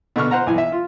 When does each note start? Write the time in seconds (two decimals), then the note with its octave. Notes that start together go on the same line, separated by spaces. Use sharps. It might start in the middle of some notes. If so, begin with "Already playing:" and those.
0.16 B2 D3 C#6 F6
0.31 C5 F#5 A#5
0.47 B1 E3 G#5
0.58 E5
0.72 F4